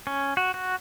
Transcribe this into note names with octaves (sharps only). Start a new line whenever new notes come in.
C#4
F#4
F#4